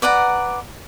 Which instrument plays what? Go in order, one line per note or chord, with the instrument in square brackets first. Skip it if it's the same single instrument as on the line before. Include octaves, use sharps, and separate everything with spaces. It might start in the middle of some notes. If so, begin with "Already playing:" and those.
[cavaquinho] B4 D5 F#5 A#5